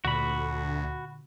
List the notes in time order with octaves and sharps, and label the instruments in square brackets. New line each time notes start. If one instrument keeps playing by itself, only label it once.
[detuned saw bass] D2 [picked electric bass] A#2 D3 [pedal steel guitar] F#4 B5